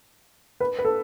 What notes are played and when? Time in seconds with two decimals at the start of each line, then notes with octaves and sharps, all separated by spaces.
0.60 B4
0.79 B4
0.85 A4